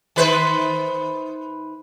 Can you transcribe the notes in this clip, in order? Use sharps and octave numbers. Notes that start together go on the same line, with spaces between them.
D#3 B4 C5